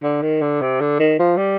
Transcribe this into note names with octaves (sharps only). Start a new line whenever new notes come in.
D3
D#3
D3
C3
D3
D#3
F3
G3